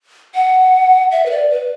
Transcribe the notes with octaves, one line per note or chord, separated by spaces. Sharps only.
F#5
E5
B4
D5
B4